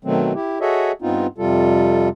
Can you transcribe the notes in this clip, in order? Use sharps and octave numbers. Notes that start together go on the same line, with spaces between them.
B2 D#3 F#3 A3 C4
E4 G4
F#4 G#4 A4 C#5 D#5 E5
G2 B3 C4 D#4 F4
F2 C3 G3 F4 A4